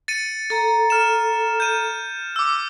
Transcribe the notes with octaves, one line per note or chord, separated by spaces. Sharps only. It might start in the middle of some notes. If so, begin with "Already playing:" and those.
A6 C#7 D#7
A4 A#5
F6 E7
G6 D#7
D6 E6